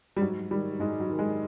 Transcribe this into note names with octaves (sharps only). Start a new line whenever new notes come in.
G3
G#2 F#3
D#3 G3
G#2 G#3
F#3
D#3
G#3